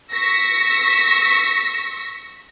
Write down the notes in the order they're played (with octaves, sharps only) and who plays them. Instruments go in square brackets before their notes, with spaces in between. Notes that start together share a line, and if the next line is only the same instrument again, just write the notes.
[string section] C#6 E6 A#6 B6 C#7